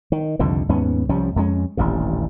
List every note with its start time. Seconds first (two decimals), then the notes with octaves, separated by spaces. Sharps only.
0.12 D#3
0.39 C2 F2 D3 D#3
0.69 D#2 G#2 B3 C#4
1.09 C2 F3 G3 C#4
1.36 F2 G#3 C#4
1.77 D#1 A1 G2